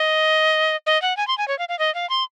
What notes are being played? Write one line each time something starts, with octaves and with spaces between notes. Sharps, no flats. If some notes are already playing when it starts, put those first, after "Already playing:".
Already playing: D#5
D#5
F#5
G#5
C6
G#5
C#5
F5
F5
D#5
F5
C6